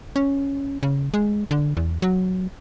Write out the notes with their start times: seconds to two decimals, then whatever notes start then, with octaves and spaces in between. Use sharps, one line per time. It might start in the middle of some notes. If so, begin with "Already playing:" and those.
0.16 C#4
0.83 C#3
1.14 G#3
1.51 D3
1.77 E2
2.02 F#3